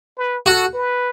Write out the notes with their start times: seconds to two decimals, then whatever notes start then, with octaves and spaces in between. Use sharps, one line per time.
0.18 B4
0.46 F#4 A4
0.74 B4